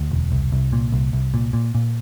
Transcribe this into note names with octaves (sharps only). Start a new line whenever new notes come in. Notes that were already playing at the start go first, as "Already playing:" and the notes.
Already playing: D2
E1
C2
C2
A#2
C2
C2
A#2
A#2
A#2